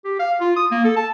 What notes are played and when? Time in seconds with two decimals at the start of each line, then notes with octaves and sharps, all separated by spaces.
0.05 G4
0.20 F5
0.41 F4
0.56 D#6
0.71 A#3
0.84 A4
0.96 A5